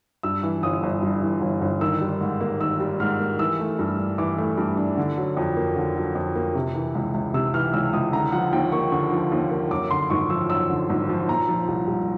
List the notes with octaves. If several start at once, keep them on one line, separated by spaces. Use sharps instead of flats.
G2 E6
E3
G1 D#6
G1
G2
E3
G1
G1
D#3 E6
G3
G#2
A#3
D#3 E6
G3
G#2 F6
A#3
E3 E6
A3
G2
D4
E3 D6
A3
G2
D4
D3
F#3
F2
A#3
D3
F#3
F2
A#3
C3
E3
C#2
C#2
C3 E6
E3 F6
C#2 E6
C#2 D#6
D3 A#5
F3 F#5
D#2 G5
A#3 C#6
D3 C#6
F3
D#2
A#3
F#2 D6
D3 C6
G#1 C#6
F3 E6
F#2 E6
D3
G#1
F3
A#2 A#5
F3
C2
C2